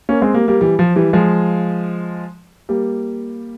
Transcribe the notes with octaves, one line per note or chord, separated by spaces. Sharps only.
A#3 C#4
G#3 C4
G3 A#3
G3 A#3
E3 G3
F3
E3 G3
F3 G#3
G3 A#3